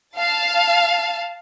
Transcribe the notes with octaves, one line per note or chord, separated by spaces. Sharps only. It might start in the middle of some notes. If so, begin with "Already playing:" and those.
F5 A5